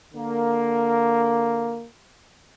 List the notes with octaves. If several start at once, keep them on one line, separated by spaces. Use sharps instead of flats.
D3 A#3